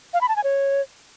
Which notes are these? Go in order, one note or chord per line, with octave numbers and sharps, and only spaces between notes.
F5
B5
A5
G#5
C#5